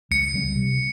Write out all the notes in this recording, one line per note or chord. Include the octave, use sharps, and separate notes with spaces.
C#2 C#7
C#3 G3 C4
C3